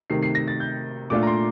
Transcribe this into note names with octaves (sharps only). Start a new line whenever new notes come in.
C3 D#3 A3 C7
C7
A#6
A6
G6
A#2 A3 D4 F4 D6
A#5
C6